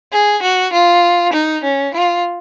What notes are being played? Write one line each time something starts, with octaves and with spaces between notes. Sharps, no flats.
G#4
F#4
F4
D#4
C#4
F4